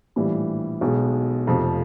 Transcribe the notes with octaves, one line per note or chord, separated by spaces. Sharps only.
A#1 A2 E3 G3
B1 B2 G#3
F1 F2 C3 F3